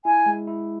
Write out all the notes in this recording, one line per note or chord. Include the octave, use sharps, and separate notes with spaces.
E4 G#5
G#3
E4